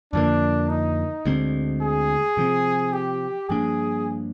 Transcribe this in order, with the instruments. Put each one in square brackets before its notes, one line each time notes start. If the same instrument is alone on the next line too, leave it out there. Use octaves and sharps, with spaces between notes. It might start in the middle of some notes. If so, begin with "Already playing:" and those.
[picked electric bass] F2 D3 F3 A#3 [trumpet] D4
[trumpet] D#4
[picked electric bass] D2 D3 G#3 C4
[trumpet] G#4
[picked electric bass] C3 F3 C4
[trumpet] G4
[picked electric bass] G2 F3 A#3 D4 [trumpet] G#4